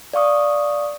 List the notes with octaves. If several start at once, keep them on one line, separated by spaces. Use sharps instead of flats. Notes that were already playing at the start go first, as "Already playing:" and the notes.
D5 F5 C#6 D#6